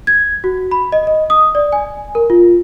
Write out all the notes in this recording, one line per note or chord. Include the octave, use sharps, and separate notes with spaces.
G#6
F#4
B5
D#5
D#5
D#6
D5
G#5
A#4
F4